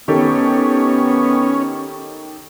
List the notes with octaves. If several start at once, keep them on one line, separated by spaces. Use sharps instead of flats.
D#3 B3 C#4 G4 A4